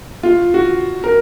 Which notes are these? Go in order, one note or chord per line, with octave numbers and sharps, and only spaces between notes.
F4
F#4
A#4